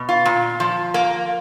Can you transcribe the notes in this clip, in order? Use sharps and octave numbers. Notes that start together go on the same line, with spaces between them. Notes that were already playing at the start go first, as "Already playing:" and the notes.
Already playing: B2
F4
A#2
F3
A#3